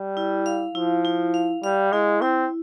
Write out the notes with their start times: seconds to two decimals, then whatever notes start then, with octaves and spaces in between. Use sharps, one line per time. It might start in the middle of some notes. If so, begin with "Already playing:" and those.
Already playing: G3
0.17 E4
0.46 F5
0.75 F3 E4
1.05 E4
1.34 F5
1.63 G3 F5
1.92 G#3 E4
2.21 C4 E4